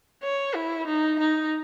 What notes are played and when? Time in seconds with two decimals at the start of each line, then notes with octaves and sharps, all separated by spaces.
0.23 C#5
0.55 E4
0.87 D#4
1.19 D#4